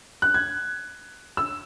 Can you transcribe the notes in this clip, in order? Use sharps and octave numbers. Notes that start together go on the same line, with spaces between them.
F#6
G#6
E6